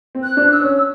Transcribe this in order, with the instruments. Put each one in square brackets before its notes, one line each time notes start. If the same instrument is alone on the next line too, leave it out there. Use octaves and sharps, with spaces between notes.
[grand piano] C4
[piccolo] F#6
[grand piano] D4
[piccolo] E6
[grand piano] C#4
[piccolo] E6